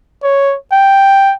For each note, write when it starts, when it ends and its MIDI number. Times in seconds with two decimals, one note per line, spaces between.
0.23 0.56 73
0.72 1.34 79